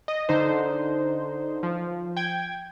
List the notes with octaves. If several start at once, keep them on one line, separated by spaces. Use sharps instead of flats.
D#5
D3 D#4 C5
F3
G5 G#6